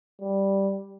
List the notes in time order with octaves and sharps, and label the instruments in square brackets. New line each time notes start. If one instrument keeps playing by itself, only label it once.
[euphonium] G3